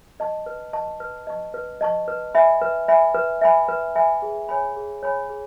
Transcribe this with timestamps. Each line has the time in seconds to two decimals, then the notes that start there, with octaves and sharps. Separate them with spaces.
0.20 D#5 A5 C#6
0.46 B4
0.73 D#5 A5 C#6
1.00 B4
1.27 D#5 A5 C#6
1.54 B4
1.81 D#5 A5 C#6
2.08 B4
2.35 E5 G#5 B5
2.62 B4
2.88 E5 G#5 B5
3.15 B4
3.41 E5 G#5 B5
3.68 B4
3.96 E5 G#5 B5
4.22 G#4
4.49 C#5 G#5 B5
4.76 G#4
5.03 C#5 G#5 B5
5.30 G#4